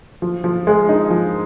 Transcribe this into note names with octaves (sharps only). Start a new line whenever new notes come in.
F3
F3
G#3
D#4
F3